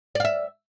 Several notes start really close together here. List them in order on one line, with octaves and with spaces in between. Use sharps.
D5 F5 E5